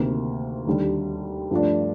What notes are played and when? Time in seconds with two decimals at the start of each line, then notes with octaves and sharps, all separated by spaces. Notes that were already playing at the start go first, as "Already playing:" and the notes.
Already playing: D2 C3 D#3 A#3
0.67 D#2 D3 G3
1.51 G2 F3 A3 D4